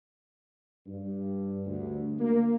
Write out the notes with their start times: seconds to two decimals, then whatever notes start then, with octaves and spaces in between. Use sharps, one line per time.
0.87 G2
1.66 D2
2.20 A#3